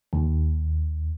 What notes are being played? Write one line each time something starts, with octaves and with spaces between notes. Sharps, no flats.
D#2